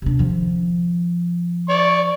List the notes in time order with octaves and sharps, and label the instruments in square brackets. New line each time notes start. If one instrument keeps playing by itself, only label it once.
[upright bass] C3 D4
D#3 F3
[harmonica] D5 C#6